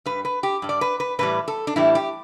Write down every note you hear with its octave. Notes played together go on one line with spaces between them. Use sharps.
G2 G3 B4
B4
G4
G2 G3
D5
B4
B4
A2 E3 G3 B4
A4
D4
A2 E3 G3 E4
G4